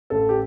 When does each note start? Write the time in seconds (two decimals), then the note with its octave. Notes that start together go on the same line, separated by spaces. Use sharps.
0.10 A1 A4
0.29 G4